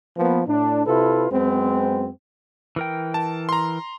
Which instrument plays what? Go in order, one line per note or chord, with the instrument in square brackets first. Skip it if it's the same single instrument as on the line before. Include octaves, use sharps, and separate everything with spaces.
[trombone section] F3 A#3 B3
A2 D4
C3 E4 F4 A4 B4
F#2 G#3 B3 C4
[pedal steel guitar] E3 A#4 G5
[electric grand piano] A5
A#5 C6